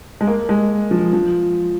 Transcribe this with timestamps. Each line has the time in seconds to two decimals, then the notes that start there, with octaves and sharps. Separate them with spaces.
0.21 G#3
0.27 A#3
0.49 G#3
0.91 F3
1.13 F3